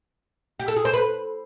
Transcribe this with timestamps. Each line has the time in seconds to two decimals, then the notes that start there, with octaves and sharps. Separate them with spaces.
0.60 G4
0.68 A4
0.77 G#4
0.85 C5
0.94 B4